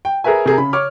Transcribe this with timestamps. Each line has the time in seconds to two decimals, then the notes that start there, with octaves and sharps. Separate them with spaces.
0.05 G5
0.24 G#4 A#4 B4 E5 G#5
0.45 C3 G#4 A#4
0.58 C#3 B5
0.73 C#5 D6 F6